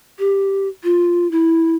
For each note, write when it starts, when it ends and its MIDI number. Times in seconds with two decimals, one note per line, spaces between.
0.19 0.68 67
0.83 1.30 65
1.31 1.76 64